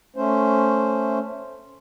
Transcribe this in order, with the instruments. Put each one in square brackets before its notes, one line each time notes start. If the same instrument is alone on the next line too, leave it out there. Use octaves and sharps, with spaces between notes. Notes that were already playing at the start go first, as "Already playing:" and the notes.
[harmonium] A3 C#4 C5